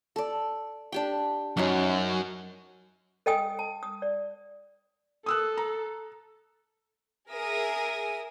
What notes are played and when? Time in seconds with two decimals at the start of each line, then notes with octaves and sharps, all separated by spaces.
0.16 A4 D5
0.92 D4 G4 G5
1.57 F#2 F#3 D#4 C5
3.26 A4 D#5 G5 G#5 D#6
3.59 A5
3.83 D#6
4.02 D5
5.26 A4 D#6 E6 F#6
5.57 A#5
7.30 G#4 A#4 E5 D#6